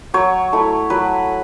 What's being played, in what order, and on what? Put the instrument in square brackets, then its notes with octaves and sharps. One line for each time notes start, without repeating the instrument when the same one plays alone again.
[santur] F#3 C#5
A3 E4
F#3 B4